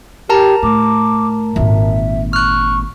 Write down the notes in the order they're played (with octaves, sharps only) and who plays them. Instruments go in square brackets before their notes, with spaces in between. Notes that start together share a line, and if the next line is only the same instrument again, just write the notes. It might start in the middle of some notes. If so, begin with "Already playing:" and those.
[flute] G4 [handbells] A#4 A5 A#5
[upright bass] A2 [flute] D6
[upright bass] G#1 A#2 [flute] E5
[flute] C#6 [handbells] F6 F#6